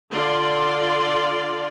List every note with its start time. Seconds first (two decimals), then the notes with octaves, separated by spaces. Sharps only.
0.12 D3 F4 D5 C6